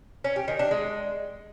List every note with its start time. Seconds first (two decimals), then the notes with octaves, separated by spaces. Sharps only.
0.24 C#4
0.36 G4
0.48 D#3
0.59 D4
0.71 G#3